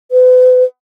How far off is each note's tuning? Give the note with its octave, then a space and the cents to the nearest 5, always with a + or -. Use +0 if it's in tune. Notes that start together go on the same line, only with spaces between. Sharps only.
B4 +40